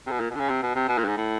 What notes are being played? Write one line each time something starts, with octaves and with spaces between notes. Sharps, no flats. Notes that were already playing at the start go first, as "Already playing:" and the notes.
C3
B2
A#2
B2
D3
C#3
C3
B2
C3
B2
A#2
G2
G#2
A2